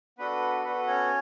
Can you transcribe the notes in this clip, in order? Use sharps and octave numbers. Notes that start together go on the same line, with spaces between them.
B3 D4 F#4 A4 B4
B3 F#4 A4 B4
C#4 C#5